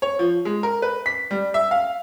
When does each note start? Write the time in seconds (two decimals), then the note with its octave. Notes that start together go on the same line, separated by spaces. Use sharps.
0.02 C#5
0.19 F3
0.45 G#3
0.63 A#4
0.82 B4
1.06 B6
1.31 G3
1.54 E5
1.71 F5